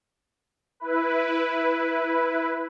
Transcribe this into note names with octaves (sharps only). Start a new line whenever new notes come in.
E4 B4